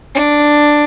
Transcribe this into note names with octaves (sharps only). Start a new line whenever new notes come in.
D4